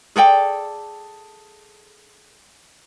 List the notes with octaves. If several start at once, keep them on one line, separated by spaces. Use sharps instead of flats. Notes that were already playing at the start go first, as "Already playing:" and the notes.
G#4 A4 D5 G5